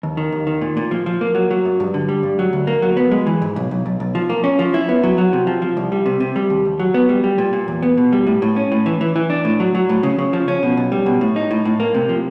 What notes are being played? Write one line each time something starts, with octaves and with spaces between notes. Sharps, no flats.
D#2
D#3
D#2
D#3
A#2
A#2
F3
F3
A#3
F#3
F#3
F#2
G2
D3
G3
G2
F#3
D2
A#3
F#3
B3
G#3
E3
G#2
B1
B1
B1
B1
F3
A#3
C#4
F3
E4
B3
F#3
F#3
C3
F3
F3
C2
G3
C3
C3
G3
D#2
D#2
F#3
B3
G3
G3
A#2
A#2
E2
B3
B2
G3
A2
A2
C#4
A2
E3
E3
E3
D4
A2
F#3
F#3
A2
C#3
C#3
F3
C#4
B2
B1
G3
B2
A2
D#4
A2
A2
A#3
C3
F3